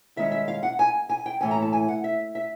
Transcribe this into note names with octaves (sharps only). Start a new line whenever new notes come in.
G2 D#3 G#3 C#4 E5
E5
F5
F#5
G#5
G#5
G5
A2 E3 A3 C#4 G#5
A#5
A5
G#5
F#5
E5
E5